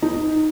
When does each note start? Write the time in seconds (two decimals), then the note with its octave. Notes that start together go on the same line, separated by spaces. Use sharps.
0.02 D#4